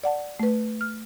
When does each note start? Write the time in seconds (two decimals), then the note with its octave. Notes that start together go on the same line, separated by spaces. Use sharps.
0.04 D5 F#5 A5
0.39 A3 B4
0.81 F6